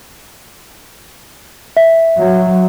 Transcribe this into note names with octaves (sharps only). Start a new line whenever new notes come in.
E5
F#3